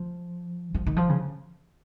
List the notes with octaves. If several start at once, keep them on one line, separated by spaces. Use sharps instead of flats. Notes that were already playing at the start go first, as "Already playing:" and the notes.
Already playing: F3
F3
D#3
F3
C#3